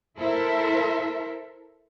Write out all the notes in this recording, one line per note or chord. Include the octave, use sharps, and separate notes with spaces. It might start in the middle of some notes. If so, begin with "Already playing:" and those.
E4 A4 A#4 C5 E5